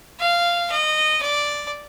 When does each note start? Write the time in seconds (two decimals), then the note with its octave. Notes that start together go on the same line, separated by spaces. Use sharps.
0.20 F5
0.71 D#5
1.22 D5